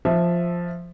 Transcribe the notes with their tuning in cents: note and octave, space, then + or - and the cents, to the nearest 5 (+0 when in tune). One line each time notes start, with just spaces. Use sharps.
F3 +0 E5 +0